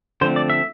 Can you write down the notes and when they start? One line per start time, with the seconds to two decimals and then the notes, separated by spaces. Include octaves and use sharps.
0.21 D3 F3 A3 C4 C5
0.36 D5
0.50 E5